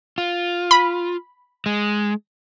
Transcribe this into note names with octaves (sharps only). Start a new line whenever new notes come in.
F4
B5
G#3